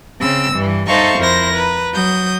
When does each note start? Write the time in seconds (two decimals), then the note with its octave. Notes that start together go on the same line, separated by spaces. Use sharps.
0.20 C#3 C4 E6
0.54 G2 E3
0.87 D#4 A4 C5 E5 F5 C#6
1.20 F2 E4 A#4 C5 A#6
1.54 B4 A#5
1.93 F#3 D#6 G6